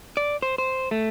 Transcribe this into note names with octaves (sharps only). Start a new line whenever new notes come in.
D5
C5
C5
A3